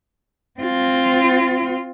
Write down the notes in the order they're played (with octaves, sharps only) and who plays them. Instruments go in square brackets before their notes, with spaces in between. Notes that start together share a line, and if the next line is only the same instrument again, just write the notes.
[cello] C4 F4